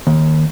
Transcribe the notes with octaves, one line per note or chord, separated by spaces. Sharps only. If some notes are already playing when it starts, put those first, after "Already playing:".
D#2